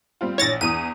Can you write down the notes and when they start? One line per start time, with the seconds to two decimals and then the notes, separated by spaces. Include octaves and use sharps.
0.21 G3 C4 F4
0.38 A#1 E3 C#5 A6 A#6
0.61 E2 E3 D#6 D#7